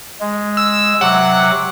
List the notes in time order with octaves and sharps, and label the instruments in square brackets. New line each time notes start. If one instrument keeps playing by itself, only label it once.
[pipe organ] G#3
[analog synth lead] E6
[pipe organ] C3 F#3 D6 [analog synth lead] F#5